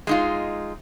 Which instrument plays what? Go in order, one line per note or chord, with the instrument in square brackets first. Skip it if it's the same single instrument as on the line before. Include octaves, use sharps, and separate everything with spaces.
[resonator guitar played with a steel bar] G#3 D#4 F4